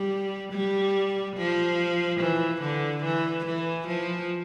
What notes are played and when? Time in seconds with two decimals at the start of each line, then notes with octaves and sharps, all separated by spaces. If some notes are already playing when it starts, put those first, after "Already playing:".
Already playing: G3
0.53 G3
1.37 F3
2.20 E3
2.62 D3
3.04 E3
3.45 E3
3.87 F3